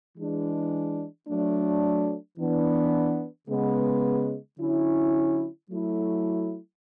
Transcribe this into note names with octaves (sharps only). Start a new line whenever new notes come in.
E3 G#3 D4
F#3 A3 D4
E3 B3 D4
C#3 G#3 B3
D3 F#3 C#4 E4
F#3 A3 E4